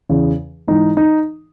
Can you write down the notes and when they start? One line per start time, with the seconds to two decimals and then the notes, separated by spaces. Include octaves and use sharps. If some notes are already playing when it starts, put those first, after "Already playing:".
0.09 E2 C#3 E3
0.68 G#2 E3 D#4
0.97 D#4